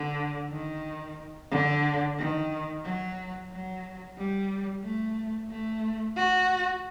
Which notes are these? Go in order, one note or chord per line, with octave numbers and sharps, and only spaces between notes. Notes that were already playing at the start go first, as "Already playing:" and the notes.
Already playing: D3
D#3
D3
D#3
F#3
F#3
G3
A3
A3
F#4